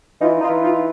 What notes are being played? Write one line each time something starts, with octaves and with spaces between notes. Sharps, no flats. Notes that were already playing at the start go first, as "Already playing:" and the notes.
E3 D#4 F4
D#4 F4
E3
D#4 F4